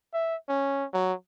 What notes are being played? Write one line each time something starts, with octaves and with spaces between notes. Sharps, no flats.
E5
C#4
F#3